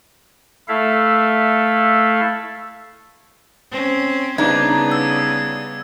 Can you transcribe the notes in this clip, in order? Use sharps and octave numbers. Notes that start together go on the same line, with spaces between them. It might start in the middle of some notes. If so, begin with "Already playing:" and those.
A3 E4 A4 E5 F5
C4 C#4
C#3 G3 B3 D4 D#4 G#6
E6